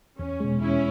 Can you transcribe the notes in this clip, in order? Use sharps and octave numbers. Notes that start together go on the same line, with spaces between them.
E2 C#4
B2 G#3
E2 C#4 E4